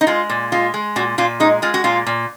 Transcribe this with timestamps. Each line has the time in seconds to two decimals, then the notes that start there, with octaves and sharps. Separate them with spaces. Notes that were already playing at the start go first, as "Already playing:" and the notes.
0.01 D#4
0.07 G#3 F4
0.30 A#2
0.52 G#3 F4
0.74 G#3
0.96 A#2 F#4
1.18 A#2 F4
1.40 G#3 D#4
1.62 G#3 F4
1.74 F#4
1.84 A#2 F4
2.07 A#2